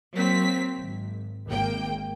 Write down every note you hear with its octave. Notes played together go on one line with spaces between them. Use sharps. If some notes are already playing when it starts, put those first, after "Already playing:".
F#3 A#3 C4 B6
G#1
G#1 A#3 G5